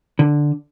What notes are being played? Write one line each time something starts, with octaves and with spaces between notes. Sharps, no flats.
D3